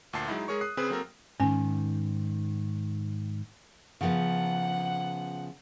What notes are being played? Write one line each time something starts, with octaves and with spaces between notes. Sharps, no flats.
D2 A#2 A5 C7
F#3 G#3 D#4 E4
G#3 G#4 A#4 C#5 C#6
D#6 F#6 C7
C#3 C4 G#4 B4 D#6
F#3 A#3 C4 A4 A#4
G#2 D#3 C#4 G#5
C#3 F3 B3 F#5